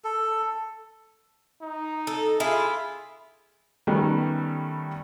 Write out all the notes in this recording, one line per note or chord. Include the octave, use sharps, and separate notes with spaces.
A4
D#4
A4
E4 F4 G#4
D#3 G3 A3 B3 C#4